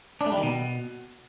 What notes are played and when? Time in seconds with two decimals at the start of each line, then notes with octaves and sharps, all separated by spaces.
0.21 D4
0.26 A3
0.32 G3
0.37 D#3
0.43 B2